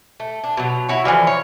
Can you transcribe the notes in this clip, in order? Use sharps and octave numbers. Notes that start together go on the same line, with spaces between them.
A3
D4
B2 F#3
E4 F#4 C#5
D3 E3 F3 G3
C#5